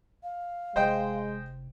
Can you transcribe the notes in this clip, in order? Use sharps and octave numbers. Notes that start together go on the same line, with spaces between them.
F5
F1 G#3 C5 D#5 G5